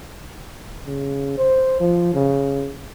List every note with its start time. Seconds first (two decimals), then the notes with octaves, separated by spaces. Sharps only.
0.86 C#3
1.38 C5
1.80 F3
2.14 C#3